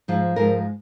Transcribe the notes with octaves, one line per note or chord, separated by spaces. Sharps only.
G#2 F3 G#3
G#2 F3 G#3 A#4